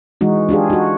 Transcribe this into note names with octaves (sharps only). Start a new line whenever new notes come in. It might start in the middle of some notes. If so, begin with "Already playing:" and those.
E3 G#3 D#4 F#4
D4 F4 G4 G#4
D#4 F#4